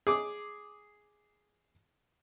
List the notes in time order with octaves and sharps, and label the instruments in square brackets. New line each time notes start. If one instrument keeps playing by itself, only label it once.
[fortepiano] G#4 D6